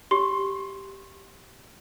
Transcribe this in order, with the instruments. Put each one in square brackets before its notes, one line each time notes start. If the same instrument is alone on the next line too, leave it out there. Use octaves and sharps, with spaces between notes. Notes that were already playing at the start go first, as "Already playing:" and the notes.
[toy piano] G4 [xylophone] C6